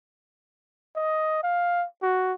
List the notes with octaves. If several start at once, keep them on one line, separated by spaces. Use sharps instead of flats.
D#5
F5
F#4